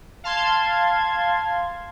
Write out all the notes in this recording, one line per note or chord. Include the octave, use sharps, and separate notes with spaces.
F5 A5 C6 G#6